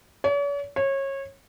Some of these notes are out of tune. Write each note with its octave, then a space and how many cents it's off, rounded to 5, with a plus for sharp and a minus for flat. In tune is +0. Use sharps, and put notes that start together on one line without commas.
C#5 +45
C#5 -25